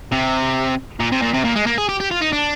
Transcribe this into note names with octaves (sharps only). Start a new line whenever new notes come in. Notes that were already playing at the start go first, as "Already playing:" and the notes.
C3
A#2
C3
A#2
C3
A#2
G#3
A#3
G#4
G4
G4
F4
D#4
D4